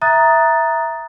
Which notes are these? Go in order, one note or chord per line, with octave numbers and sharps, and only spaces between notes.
E5 A#5 D#6 F#6 A6